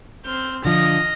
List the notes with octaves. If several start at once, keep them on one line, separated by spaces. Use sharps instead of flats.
C4 F6 G6
D3 F3 D#5 F6 A#6